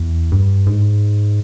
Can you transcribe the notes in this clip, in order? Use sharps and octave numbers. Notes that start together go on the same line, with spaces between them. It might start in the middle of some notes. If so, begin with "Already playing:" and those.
Already playing: E2
G2
G#2